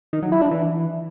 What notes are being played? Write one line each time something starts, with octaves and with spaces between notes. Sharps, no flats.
D#3
F#3
E4
D4
E3